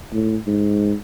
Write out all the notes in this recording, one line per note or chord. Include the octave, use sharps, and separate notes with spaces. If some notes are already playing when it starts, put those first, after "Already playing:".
A2
G#2